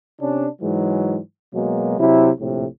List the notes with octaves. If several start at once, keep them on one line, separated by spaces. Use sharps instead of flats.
C3 C#4 D4
G#2 E3 F#3 G#3
B2 F#3 G#3 A#3
C3 F#3 E4
A#1 A2 C3